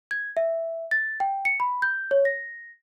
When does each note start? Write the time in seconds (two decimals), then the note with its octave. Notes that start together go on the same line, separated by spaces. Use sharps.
0.11 G#6
0.37 E5
0.91 A6
1.20 G5
1.45 C#7
1.60 B5
1.82 G6
2.11 C#5
2.25 A#6